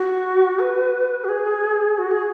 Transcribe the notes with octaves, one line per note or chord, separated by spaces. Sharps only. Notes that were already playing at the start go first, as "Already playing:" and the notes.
Already playing: F#4
B4
F#4
G#4
F#4
G#4